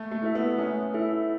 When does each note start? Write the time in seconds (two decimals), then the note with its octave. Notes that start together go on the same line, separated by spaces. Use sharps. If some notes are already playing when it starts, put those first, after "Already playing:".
Already playing: A3
0.11 A3
0.23 E4 A4 E5
0.35 B3
0.59 A3 C#4
0.94 E4 A4 E5